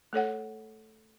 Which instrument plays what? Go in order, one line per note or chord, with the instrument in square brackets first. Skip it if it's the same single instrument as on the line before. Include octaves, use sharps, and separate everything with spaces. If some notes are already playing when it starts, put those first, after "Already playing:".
[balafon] A3 A4 C#5 F#5